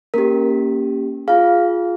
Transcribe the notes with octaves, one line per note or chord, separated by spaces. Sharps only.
A#3 C#4 G4 A#4
F4 G#4 F5